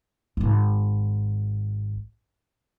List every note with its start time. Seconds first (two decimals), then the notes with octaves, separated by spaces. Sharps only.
0.37 D1 G#1